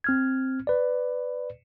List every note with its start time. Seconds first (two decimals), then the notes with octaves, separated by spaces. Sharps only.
0.04 C4 F6 G#6
0.67 B4 D5